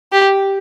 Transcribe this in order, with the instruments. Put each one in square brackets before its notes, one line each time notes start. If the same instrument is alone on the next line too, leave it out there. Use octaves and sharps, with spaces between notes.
[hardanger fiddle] G4